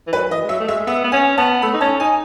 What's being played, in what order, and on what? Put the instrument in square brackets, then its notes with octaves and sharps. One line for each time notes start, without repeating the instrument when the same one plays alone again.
[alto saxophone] E3
[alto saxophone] F#3 [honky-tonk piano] B4
[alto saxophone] E3 [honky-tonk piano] D#5
[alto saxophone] G#3
[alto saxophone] F#3 [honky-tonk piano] E5
[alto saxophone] A3
[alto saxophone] G#3 [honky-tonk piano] E5
[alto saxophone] B3 [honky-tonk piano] E5
[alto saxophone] B3
[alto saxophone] C#4 [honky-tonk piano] G#5
[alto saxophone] B3 [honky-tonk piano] A5
[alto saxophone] A3 [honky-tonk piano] B5
[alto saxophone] D#4
[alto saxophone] C#4 [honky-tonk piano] A5
[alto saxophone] D#4 [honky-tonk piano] G#5